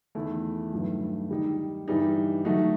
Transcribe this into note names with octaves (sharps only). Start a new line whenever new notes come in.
E2 D#3 A3 E4
G2 D#3 F#3 A3
D#3 G3 D#4
G2 E3 G3 D#4
D#3 F#3 A3 D#4 F#4